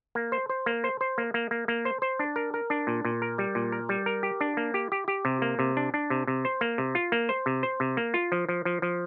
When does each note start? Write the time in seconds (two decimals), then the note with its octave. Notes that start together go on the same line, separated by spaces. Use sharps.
0.15 A#3
0.32 C5
0.50 C5
0.66 A#3
0.84 C5
1.01 C5
1.18 A#3
1.34 A#3
1.51 A#3
1.68 A#3
1.85 C5
2.02 C5
2.19 D4
2.36 A#4
2.54 A#4
2.70 D4
2.87 A#2
3.05 A#2
3.22 A#4
3.38 G3
3.55 A#2
3.72 A#4
3.89 G3
4.06 A#4
4.23 G4
4.41 D4
4.57 A#3
4.74 G4
4.92 G4
5.08 G4
5.25 C3
5.42 A#3
5.59 C3
5.77 D4
5.94 D4
6.10 C3
6.27 C3
6.45 C5
6.61 A#3
6.78 C3
6.95 F4
7.12 A#3
7.29 C5
7.46 C3
7.63 C5
7.80 C3
7.97 A#3
8.14 F4
8.32 F3
8.49 F3
8.65 F3
8.82 F3